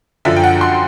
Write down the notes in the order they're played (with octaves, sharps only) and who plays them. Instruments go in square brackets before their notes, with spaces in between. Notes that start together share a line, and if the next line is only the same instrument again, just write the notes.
[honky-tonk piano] F#2 D3 F3 E5
G5
F#5
C6